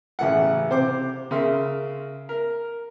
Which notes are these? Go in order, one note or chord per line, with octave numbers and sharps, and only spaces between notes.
A1 C#3 E3 A3 F#5
C3 C5 C6 D6
C#3 A#4 E5 C6
A#4